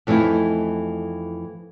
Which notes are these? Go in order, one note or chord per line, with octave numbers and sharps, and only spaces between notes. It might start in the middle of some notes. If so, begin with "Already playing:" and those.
F2 E3 A3 D#4 E4